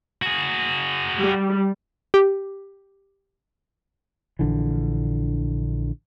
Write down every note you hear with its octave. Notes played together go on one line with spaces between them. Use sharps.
F#4 G#4
G3
G4
A#1 D3 E3